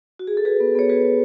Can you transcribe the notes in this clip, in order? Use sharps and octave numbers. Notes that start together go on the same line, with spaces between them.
F#4
G#4
A4
F#4 G#4 B4
B3
B3 C#5
F#4 G#4 B4
F#4